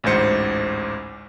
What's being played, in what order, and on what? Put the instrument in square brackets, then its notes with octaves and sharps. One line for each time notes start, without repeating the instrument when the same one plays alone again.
[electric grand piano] A1 D2 G#2 C5 C#7